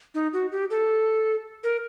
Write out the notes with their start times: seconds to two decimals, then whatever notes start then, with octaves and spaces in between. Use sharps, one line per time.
0.15 D#4
0.33 F#4
0.52 G4
0.70 A4
1.64 A#4